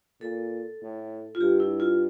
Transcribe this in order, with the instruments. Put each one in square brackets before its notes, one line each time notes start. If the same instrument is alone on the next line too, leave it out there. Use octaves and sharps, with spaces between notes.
[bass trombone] A#2 [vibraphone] A4
[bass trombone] A2
[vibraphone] F4
[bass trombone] G2 [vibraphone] G4
[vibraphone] E4
F4